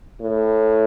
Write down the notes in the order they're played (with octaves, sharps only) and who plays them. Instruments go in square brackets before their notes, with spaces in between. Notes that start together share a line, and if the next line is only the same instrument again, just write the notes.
[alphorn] A2